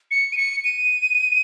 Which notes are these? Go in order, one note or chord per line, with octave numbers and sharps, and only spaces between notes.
C#7
D#7
C#7
D#7